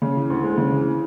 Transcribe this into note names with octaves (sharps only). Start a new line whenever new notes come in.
C#3
E3
D2
G#3
C#3
E3